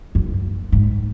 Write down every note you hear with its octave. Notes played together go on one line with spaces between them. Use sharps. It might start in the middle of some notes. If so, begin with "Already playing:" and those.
F#2
G#2